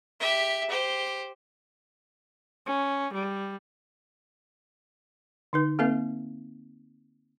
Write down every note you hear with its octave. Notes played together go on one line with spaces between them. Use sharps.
G4 E5
G4 C5
C#4
G3
D3 D#4 B4
A#3 C4 A4 B4 E5